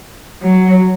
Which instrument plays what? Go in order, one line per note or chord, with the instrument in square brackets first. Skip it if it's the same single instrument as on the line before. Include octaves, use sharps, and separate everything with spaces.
[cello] F#3